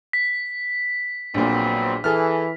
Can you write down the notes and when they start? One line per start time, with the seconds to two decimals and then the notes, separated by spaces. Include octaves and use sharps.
0.13 B6
1.34 A#1 A#2 F#3 B3 C4
2.04 E3 G#4 A4 F6